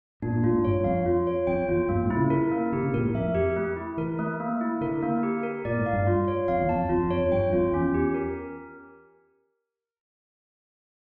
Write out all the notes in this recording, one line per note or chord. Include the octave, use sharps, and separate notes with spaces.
A#2 D4
A#2
A#2 F4
A2
G2 C#5
F2 F5
F4
C#5
F2 G5
E2 F4
G2 A#3
A2
E4
C#3
A#4
A#3
D3 G4
C#3
A#2 A#4
A2
F2 E5
G4
A3
E4
E3 A#4
A3
A#3
E4
D3 A#4
A#3
G4
A#4
A#2 D5
A2
F5
G2
F4
C#5
F2 F5
E2
A5
F2
F2 F4
F2
C#5
F2
G2 G5
F2 F4
E2 C#4
G4
A#4